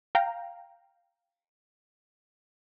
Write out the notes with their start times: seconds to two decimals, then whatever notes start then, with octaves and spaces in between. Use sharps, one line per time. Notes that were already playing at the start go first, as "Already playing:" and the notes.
0.15 F5 G5 A#5